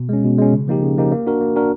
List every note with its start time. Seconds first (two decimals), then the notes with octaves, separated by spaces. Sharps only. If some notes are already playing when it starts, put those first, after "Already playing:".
Already playing: B2
0.09 G#3 C#4
0.24 B2
0.38 G#3 C#4
0.53 C#3
0.68 F3 A#3 D#4 G4
0.83 C#3
0.97 F3 A#3 D#4 G4
1.12 A#3
1.27 D4 F#4 A#4
1.41 A#3
1.56 D4 F#4 A#4